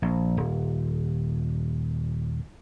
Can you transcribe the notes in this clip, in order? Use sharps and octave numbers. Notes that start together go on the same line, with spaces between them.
A#1
D#1